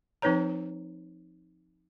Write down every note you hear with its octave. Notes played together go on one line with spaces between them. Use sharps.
F3 C4 D#4 B4 C#5 A#5